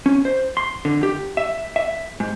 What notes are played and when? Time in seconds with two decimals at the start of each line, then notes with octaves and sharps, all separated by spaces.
0.06 C#4
0.25 C5
0.57 C6
0.85 D3
1.03 G4
1.37 E5
1.76 E5
2.20 G#2